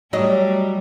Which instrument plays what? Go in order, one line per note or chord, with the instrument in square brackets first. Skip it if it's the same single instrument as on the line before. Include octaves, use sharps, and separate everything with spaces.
[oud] F#3 D#5 [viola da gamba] G3 A3